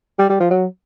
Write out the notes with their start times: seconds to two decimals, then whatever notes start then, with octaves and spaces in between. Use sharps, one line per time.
0.19 G3
0.29 G3
0.40 F3
0.50 F#3